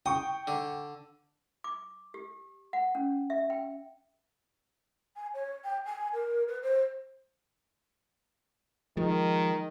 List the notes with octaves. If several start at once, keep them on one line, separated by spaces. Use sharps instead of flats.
G5 C#6 D#6
D3
D6
G4
F#5
C#4
E5
G5
G#5
C#5
G5
G#5
A#4
B4
C5
D#3 F3 G#3